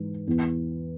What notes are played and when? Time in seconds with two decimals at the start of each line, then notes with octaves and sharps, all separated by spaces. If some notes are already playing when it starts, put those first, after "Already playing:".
Already playing: G#2 E3
0.27 E2 E3 B3